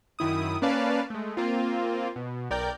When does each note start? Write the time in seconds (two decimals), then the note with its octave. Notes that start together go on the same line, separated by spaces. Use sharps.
0.19 F#2 D#3 E4 D#6
0.62 A#3 C#4 B4 D5 F5 A5
1.10 G#3 A3
1.37 A#3 C4 F4
2.16 B2
2.50 B1 A#4 D5 G5 G6